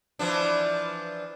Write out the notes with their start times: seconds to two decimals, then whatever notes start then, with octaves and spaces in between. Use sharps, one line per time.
0.19 E3 F3 D4